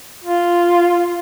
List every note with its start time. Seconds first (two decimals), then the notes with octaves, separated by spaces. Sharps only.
0.24 F4